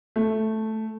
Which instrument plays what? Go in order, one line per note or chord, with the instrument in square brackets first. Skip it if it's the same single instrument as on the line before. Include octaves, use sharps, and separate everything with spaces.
[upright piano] A3